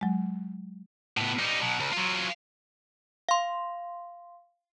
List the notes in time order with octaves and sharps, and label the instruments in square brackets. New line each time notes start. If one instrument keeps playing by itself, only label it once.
[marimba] F#3 G#3
[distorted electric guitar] A2 B3
G3 D#4
B2 F#3
C#2
F#3 F4
[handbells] F5 C6